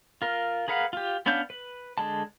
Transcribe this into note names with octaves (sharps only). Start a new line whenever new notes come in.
F4 A#4
G#4 A#4 B4 F5 F#5
F4 G4
B3 C#4 D4 F5 G6
B4
D3 G#3 A5